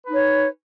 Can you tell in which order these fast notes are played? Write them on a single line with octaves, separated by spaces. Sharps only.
B4 D#4 C#5